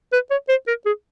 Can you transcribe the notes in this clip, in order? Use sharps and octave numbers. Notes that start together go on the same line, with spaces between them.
B4
C#5
C5
A#4
G#4